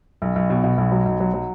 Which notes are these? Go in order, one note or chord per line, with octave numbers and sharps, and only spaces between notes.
B1
B1
B2
B2
B1
F#3
B1
F#3
F#3